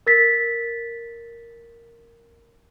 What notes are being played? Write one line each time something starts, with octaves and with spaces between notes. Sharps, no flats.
A#4 A6 B6